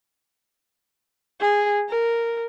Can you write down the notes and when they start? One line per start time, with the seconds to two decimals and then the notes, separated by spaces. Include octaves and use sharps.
1.41 G#4
1.89 A#4